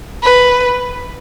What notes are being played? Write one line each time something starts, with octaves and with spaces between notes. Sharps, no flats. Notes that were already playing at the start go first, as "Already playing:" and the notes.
B4